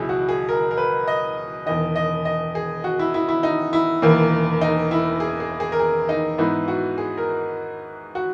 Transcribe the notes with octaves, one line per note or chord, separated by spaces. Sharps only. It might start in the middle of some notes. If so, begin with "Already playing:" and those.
Already playing: C#2 B2 F#3 E4 G#4
F#4
G#4
A#4
A#4
B4
D#5
E1 E2 D#3 D#5
D#5
D#5
G#4
F#4
E4
E4
E4
D#4
E4
E1 E2 D#3 A#3
D#4
E4
G#4
G#4
G#4
A#4
G#4
D#4
G#2 E3 B3 D#4 E4
F#4
G#4
A#4
F#4